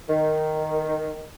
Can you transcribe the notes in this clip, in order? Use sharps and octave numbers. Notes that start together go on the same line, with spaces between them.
D#3